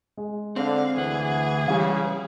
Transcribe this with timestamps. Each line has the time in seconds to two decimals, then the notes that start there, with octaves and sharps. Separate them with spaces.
0.17 G#3
0.56 D3 C4 F5
0.97 D2 E3 G#4 F#5
1.68 C#3 E3 G3 F5